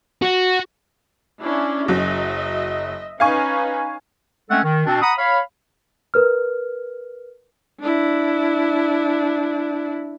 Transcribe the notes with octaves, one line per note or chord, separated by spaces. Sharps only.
F#4
C#4 D4 E4
F#1 F#3 D#5 E5
C#4 D#4 B4 F5 G#5 C#6
G#3 A3 C4 C#4 A4 F#5
D#3
B2 C4 D4
F#5 A#5 B5 D#6
C#5 F5 B5
A#4 B4 F6
D4 E4